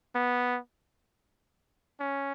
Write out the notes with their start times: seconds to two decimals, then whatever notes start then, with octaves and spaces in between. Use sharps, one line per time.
0.15 B3
2.00 C#4